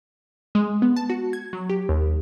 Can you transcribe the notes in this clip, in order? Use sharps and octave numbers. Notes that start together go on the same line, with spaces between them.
G#3
B3
A5
F#4
G#6
F#3
G4
D#2